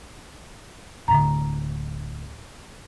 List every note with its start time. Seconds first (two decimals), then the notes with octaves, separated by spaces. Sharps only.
1.08 D1 A2 D3 A#5